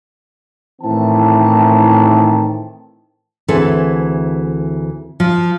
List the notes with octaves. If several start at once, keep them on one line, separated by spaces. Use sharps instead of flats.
A2 D#3 E3 C4 A5
D2 E3 C4 G#4 A4
F3